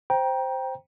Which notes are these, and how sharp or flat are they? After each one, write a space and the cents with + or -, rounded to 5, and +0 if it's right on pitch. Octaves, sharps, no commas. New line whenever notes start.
C5 +0 G5 +0 A#5 +25